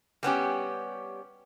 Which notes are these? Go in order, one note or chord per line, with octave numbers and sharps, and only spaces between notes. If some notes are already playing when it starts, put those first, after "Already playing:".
G3 B3 C#4 G4